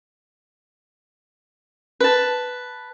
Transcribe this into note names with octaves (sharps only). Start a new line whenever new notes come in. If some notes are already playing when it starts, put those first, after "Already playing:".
B4 A5